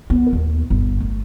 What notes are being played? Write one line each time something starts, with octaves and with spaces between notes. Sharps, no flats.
B3
D#2
G1
A3